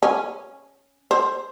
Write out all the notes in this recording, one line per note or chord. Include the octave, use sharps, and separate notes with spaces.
C#4
C5